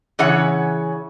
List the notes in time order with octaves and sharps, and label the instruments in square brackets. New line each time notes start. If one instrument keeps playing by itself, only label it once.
[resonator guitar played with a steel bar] C#3 E3 C#5 F#5